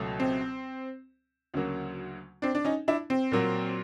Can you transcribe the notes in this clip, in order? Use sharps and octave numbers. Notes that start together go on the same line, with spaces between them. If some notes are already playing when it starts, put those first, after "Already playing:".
Already playing: C#2 B2 F#3 A3
C4
D2 C#3 F#3 A#3
C4 D4
D4
C#4 D#4
D4 E4
C4
A#2 F#3 A#3